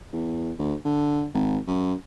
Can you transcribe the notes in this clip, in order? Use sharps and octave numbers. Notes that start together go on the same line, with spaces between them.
E2
D2
D3
G#1
F#2